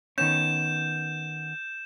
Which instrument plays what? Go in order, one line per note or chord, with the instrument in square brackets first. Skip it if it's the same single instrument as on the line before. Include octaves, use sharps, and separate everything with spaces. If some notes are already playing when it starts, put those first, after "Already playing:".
[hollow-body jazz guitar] D#3 B3 C#4 [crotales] G6 E7